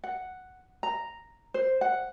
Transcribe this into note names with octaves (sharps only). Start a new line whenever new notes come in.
F#5
A#5
C5
F#5